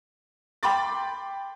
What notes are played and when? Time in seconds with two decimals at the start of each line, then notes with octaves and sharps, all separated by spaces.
0.63 G5 B5 C6 D6 A6